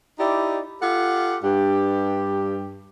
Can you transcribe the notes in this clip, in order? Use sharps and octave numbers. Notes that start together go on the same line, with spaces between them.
D#4 E4 G4 D5
F4 G4 A4 F#5
G2 G4